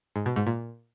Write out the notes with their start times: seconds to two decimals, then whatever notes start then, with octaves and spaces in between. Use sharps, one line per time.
0.16 G#2
0.26 B2
0.36 G#2
0.47 A#2